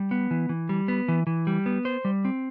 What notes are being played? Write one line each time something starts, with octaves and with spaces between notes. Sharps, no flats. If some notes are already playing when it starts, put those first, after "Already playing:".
Already playing: G3
B3
E3
E3
G3
B3
E3
E3
G3
B3
C5
G3
C4